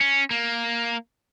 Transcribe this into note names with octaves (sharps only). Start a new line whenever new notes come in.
C#4
A#3